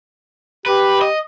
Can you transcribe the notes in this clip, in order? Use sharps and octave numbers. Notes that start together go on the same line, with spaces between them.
G4 B4
D#5